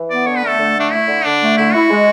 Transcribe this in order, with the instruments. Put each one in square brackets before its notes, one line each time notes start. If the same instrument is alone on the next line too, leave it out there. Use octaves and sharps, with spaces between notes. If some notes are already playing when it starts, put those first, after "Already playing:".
Already playing: [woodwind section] E3
[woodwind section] B3 [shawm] D5
[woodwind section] D3 [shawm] C#5
[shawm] B4
[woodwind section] A3
[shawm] A4
[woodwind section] D3
[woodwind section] A3 [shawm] D4
[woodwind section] A3 [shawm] E4
[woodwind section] D3
[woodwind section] D3 [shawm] D4
[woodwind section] A3
[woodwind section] D3 [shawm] E4
[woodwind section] E4 [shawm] F#4
[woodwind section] G#3